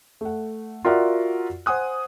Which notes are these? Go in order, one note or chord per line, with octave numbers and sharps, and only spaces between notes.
A3 F#5
F4 F#4 A#4 D5 E5 F#5
C5 F#5 G#5 D#6 F#6